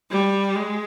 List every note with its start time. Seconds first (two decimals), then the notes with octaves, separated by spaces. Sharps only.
0.11 G3
0.55 G#3